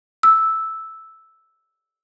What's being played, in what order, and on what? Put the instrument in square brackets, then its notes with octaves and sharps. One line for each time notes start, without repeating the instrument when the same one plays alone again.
[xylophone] E6